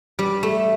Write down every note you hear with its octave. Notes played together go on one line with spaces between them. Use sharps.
G3
A3